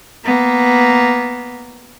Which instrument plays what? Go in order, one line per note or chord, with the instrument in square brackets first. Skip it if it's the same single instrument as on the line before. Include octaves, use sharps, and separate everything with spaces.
[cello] A#3 B3